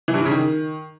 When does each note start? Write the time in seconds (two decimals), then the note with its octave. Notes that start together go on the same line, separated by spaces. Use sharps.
0.08 E3
0.14 G2
0.20 E3
0.25 C#3
0.31 D#3